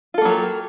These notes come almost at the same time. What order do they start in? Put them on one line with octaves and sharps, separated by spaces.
F4 A4 A#3 F#3 G4